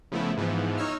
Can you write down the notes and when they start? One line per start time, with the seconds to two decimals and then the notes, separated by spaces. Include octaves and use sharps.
0.12 C#3 F3 A3 B3 E4
0.37 G#2 E3 F3 B3
0.78 D#4 C#5 E6 F6